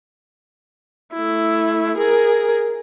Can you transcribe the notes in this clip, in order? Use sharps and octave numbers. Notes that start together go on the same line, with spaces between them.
A3 E4
G#4 A#4